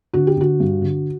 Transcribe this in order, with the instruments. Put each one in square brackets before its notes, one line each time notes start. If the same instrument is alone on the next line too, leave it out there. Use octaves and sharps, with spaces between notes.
[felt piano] D3 F#4
G4
D3 F#4
G2
D3